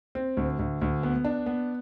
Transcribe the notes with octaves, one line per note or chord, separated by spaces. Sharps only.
C4
D2
D2
D2
B3
D4
B3